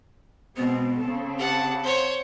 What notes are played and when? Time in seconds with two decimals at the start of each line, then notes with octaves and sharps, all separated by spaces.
0.57 B2 G#3 B3 C4
0.98 C#3 C4 A4
1.39 G4 F#5 A5
1.83 C5 C#5 F#5